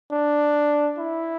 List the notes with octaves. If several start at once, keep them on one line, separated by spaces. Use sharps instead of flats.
D4
E4